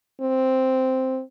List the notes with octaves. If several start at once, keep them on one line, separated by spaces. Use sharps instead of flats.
C4